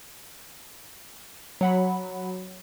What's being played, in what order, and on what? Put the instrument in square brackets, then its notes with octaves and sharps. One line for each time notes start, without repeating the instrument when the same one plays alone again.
[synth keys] F#3 F#5 B5